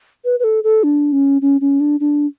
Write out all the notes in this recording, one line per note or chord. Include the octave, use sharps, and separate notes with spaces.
B4
B4
A4
A4
D4
C#4
C#4
C#4
D4
D4